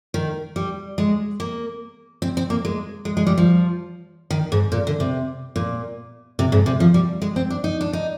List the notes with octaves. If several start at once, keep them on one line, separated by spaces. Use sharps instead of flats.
D#3
G3
G#3
A#3
C4
C4
A#3
G#3
G#3
G#3
G3
F3
D#3
G#2
A#2
D3
C3
A#2
C3
G#2
C3
F3
G3
G#3
C4
D4
D#4
D4
D#4